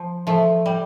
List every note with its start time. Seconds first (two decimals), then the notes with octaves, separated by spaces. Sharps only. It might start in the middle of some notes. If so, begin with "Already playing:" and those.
Already playing: F3
0.27 F3 A3
0.66 G3